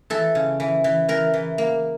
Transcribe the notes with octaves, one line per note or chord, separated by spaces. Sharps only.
E3 A4
C#3
E3
E3
E3 A#4
E3
A#3